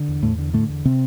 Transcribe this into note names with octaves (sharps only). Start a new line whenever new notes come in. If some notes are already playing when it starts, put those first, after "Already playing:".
Already playing: D3
E2
E2 A2 A3
D3
A2 D3 A3
E2
C3 C4